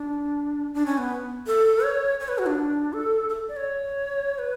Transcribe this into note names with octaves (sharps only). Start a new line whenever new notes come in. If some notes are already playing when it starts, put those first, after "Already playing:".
Already playing: D4
D4
C#4
B3
A4
C#5
C#5
B4
F#4
D4
A4
A4
D5
C#5
B4